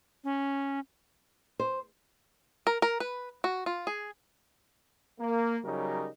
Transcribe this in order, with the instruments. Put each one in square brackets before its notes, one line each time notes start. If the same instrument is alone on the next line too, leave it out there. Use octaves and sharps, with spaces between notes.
[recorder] C#4
[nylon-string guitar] C5
[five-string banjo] A#4
A#4
B4
F#4
F4
G#4
[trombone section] A#3
C#3 F#3 G3 D#4 A#4